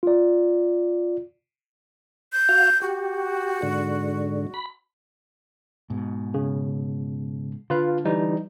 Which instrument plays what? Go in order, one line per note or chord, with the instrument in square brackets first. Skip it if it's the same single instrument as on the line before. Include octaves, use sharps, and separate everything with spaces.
[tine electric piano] F4 D5
[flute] G6
[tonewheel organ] F#4 F5
[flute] F#4 [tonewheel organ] G4
[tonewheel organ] G#2 D3
B5
[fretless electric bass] G#2 B2
[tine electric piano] C#3
[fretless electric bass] D3 [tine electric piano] F4 B4 F5
[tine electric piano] E3 G3 D#4